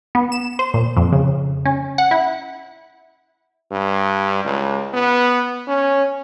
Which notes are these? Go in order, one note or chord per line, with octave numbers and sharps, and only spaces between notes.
B3
E7
C5
A#2
F2
C#3
C#4
F#5
E4
G2
C#2
B3
C#4